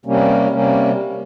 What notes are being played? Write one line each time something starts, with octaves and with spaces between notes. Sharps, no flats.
C3 G3 A#3 C#4
C3 G3 A#3 C#4